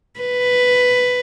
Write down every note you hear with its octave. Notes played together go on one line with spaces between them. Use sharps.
B4